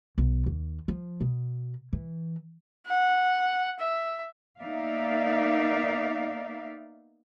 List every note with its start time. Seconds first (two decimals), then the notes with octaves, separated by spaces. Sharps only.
0.18 B1
0.46 D#2
0.88 F3
1.21 B2
1.93 E3
2.87 F#5
3.79 E5
4.60 A#3 B3 D#4 D5 E5 F5